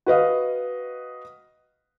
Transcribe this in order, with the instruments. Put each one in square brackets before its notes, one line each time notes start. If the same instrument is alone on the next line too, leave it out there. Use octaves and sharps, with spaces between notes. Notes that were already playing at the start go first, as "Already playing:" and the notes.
[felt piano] F#4 B4 D#5 F5